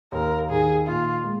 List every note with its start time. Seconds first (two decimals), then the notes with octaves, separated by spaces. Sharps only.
0.12 D#2 A#4
0.49 D#3 G#4
0.87 A#2 F4
1.24 G#3